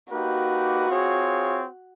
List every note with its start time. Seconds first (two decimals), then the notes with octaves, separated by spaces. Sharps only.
0.12 A#3 D#4 F#4 G4 B4
0.89 C4 F4 G#4 C#5